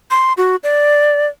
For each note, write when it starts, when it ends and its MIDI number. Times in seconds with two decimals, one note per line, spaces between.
0.11 0.33 84
0.37 0.56 66
0.63 1.27 74